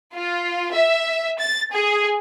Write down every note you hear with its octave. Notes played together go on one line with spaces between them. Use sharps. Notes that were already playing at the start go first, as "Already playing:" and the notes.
F4
E5
A6
G#4